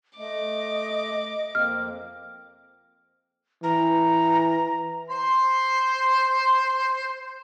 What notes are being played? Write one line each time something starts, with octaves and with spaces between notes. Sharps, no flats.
A3 D#5 D6
F2 A#3 C4 F6
E3 A#5
C5 C6